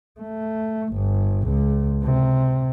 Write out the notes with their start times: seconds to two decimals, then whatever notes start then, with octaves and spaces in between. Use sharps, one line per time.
0.20 A3
0.94 G1
1.48 C#2
2.04 C3